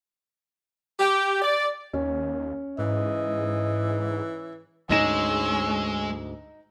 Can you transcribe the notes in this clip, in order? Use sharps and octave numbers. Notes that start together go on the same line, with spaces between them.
G4
D5
D#2 C#4
G#2 E3 D#5
D2 G#2 G#3 C#4 D#4 E6 A#6 E7